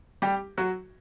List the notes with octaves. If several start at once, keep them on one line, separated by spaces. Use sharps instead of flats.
G3 G4
F#3 F#4